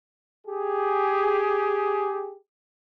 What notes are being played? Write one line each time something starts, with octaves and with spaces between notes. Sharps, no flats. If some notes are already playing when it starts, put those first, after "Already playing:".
G4 G#4